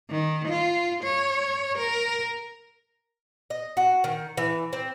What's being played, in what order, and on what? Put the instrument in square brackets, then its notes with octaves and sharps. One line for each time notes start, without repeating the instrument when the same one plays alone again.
[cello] D#3
F4
C#5
A#4
[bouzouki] D#5
F#4
D#3
E3
C4